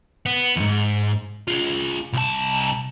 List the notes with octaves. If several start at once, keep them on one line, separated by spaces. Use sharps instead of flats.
B3
E2 G#2
F4 G#4
C2 A5